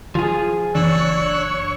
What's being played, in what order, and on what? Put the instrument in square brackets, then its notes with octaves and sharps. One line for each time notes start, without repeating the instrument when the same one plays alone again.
[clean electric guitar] F3 F4 G#4
[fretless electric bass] F#1 E3 [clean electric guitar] D4 [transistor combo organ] C#5 [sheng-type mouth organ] E6 F#6